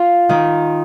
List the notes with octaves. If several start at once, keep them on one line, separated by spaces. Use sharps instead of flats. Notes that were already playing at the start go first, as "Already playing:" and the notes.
Already playing: F4
D#3